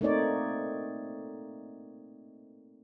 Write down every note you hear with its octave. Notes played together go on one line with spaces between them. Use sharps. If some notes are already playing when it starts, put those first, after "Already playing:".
A3 A#3 C4 D#4 C#5 D5